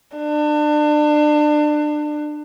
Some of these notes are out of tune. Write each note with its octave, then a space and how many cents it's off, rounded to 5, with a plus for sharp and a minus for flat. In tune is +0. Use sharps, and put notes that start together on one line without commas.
D4 +30